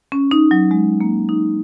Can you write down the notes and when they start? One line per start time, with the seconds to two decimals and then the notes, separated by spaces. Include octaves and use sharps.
0.12 C#4
0.31 D#4
0.51 F#3
0.71 G#3
1.01 A#3
1.29 D#4